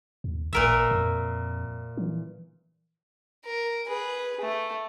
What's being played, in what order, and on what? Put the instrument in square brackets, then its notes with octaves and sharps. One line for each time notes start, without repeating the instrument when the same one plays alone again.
[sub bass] D#2
[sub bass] A1 [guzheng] A#2 A#4 E5
[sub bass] F2
E3
[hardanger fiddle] A#4
G#4 B4
A3